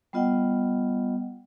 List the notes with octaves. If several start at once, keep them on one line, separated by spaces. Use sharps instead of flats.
G3 B3 F4 D#5 F#5 G5